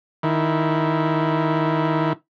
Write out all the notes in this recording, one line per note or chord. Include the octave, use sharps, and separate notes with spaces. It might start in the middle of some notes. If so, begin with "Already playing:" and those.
D#3 E4